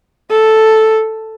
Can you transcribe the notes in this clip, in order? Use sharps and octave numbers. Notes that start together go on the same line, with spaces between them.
A4